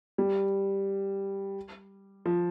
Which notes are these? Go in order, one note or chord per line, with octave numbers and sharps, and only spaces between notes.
G3
F3